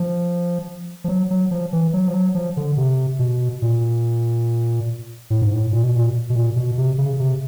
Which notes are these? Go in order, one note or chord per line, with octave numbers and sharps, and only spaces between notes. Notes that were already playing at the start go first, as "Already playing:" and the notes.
Already playing: F3
F3
F#3
F#3
F3
E3
F#3
F3
F#3
F3
D3
C3
B2
A#2
A2
G#2
A2
A#2
B2
A#2
B2
A#2
B2
C3
C#3
C3